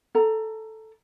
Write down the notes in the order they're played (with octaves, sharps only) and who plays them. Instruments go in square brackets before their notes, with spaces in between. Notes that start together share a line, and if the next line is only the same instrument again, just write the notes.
[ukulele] A4 A#5